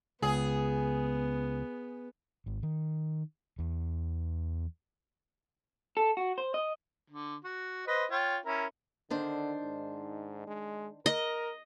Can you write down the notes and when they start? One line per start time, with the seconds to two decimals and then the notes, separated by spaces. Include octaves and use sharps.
0.22 C#2 B3 G#4
2.46 G#1
2.63 D#3
3.59 E2
5.97 A4
6.17 F#4
6.38 C5
6.54 D#5
7.10 D3
7.44 F#4
7.87 B4 C5 D#5
8.11 F4 C#5 G5
8.45 C#4 E4 A#4
9.10 D3 D#3 D4 C5
9.63 G#2
10.47 G#3
11.06 A#4 D#5